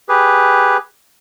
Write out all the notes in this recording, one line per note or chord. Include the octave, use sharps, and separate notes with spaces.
G4 G#4 B4